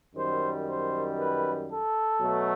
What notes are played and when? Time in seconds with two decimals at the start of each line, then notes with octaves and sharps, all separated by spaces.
0.15 F#2 D#3 G3 C5
0.67 C5
1.18 B4
1.71 A4
2.22 B2 F#3 A3